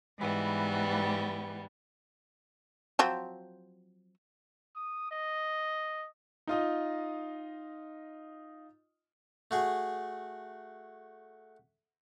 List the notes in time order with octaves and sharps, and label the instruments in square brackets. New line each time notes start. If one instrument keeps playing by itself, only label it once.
[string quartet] G#2 E3 G3 B3
[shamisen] F3 F#3 C4
[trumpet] D#6
D#5
[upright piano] D#4 F4 D#5
[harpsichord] A3 F#4 G#4